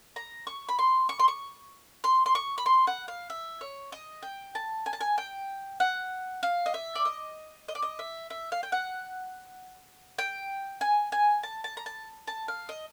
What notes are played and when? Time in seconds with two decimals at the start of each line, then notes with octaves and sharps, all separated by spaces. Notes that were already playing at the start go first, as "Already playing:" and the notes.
0.16 A#5
0.47 C#6
0.69 B5
0.79 C6
1.09 C#6
1.19 C6
1.28 C#6
2.04 C6
2.26 C6
2.35 C#6
2.58 B5
2.66 C6
2.87 F#5
3.08 F5
3.30 E5
3.61 C#5
3.92 D#5
4.22 G5
4.55 A5
4.86 G#5
4.93 A5
5.01 G#5
5.18 G5
5.80 F#5
6.43 F5
6.66 D#5
6.74 E5
6.95 D5
7.05 D#5
7.68 D#5
7.75 D5
7.82 D#5
7.99 E5
8.30 E5
8.52 F5
8.63 G5
8.72 F#5
10.18 G5
10.81 G#5
11.12 G#5
11.43 A5
11.64 A5
11.77 A#5
11.86 A5
12.27 A5
12.48 F5
12.69 D#5